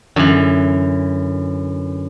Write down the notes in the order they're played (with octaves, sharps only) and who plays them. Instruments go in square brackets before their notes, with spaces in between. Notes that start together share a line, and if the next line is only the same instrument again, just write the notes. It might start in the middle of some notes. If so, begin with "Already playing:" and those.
[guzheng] F#2 E3 [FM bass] D3